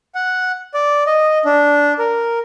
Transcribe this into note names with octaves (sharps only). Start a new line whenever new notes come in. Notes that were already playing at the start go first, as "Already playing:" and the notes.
F#5
D5
D#5
D4
A#4